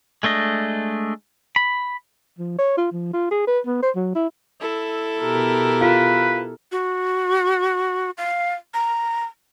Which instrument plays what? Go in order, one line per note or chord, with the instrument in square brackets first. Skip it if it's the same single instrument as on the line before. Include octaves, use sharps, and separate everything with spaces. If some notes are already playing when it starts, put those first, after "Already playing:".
[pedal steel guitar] G#3 A3 D4 D#5
B5
[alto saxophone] F3
C#5
F4
F3
F4
G#4
B4
B3
C5
F#3
E4
[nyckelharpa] E4 A4
[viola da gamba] B2 G4 A#4
[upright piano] F4 [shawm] B4
[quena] F#4
F5
A#5